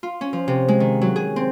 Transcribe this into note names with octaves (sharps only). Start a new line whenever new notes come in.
F4
C#4
F3
C3
G#3
D#3
F#3
G#4
C4